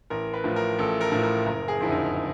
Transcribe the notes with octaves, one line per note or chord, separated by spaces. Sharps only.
A1 A#4
B4
A2 F3
A#4
A1 A4
A#4
A2 F3
A#4
F#1 A#4
G#4
F2 D3 E4
D#4